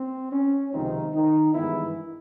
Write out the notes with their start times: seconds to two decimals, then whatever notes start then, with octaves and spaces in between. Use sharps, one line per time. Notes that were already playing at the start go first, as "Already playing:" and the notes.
Already playing: C4
0.31 C#4
0.72 C#2 C3 D#3 F3 G#3 C4 D#4
1.13 D#3 D#4
1.54 G2 D#3 E3 G#3 B3 E4